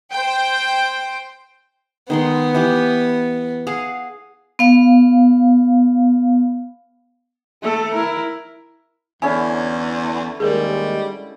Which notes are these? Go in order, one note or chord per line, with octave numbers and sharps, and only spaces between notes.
C5 G5
D#3 G#3 B3 C6
E3 G4 B5
G#4 F5 F#5
B3 F5
A3 A4
E4 A#4
E2 D3 C#4 E4 G#5
D#2 G3 G#3 G#4 A#4